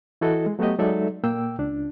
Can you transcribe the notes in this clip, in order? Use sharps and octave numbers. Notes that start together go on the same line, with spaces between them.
E3 E4 F#4 A4 D#5
G#3
F#3 A3 B3 F#4 G4 D#5
F#3 G#3 D#4 A4 D5 E5
A#2 A#3 G5 E6
C#2 D4